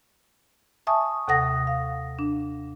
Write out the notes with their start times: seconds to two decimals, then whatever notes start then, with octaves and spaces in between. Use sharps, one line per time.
0.87 E5 G#5 A5 C#6 D#6
1.28 D#2 C3 A4 F#5 D#6 A#6
1.67 F5
2.19 D4